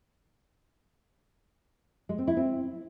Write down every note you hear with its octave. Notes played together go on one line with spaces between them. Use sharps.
G#3
C4
E4
C4